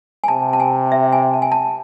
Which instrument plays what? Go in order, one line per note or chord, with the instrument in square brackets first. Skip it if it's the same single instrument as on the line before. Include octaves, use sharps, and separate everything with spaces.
[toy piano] G#5
[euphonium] C3 [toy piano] A5
[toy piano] A5
G#5
E5
G#5
A5
G#5
A5